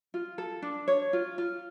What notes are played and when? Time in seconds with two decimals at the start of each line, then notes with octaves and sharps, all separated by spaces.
0.14 F4
0.38 A4
0.62 D4
0.88 C#5
1.13 F4
1.38 F4